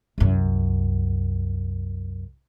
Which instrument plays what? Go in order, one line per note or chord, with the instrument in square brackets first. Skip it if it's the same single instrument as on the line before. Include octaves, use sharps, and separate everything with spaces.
[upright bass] C2 F#2